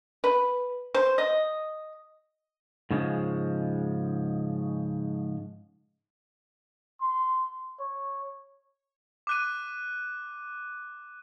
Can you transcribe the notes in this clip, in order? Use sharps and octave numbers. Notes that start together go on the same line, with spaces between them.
B4
C5
D#5
G#2 C#3 F3 G#3
C6
C#5
D6 F#6 D#7